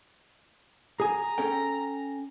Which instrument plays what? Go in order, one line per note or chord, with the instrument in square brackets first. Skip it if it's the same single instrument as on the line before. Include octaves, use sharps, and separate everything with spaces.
[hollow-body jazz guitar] G#4 G#5 [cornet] A#5
[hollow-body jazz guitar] C#4 A4 G5